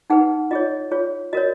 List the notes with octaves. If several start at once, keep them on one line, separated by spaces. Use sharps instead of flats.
D#4 G#4 B4 F#5
F4 G#4 C#5 D#5
F4 G#4 C#5
F#4 A#4 C#5 D#5